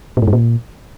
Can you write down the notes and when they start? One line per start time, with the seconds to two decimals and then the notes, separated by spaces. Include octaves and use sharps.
0.17 A#2
0.22 G#2
0.28 G2
0.33 A#2